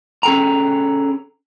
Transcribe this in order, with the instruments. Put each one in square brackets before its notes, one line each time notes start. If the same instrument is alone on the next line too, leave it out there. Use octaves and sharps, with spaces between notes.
[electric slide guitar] C#4 G#4 A4 G5 A#5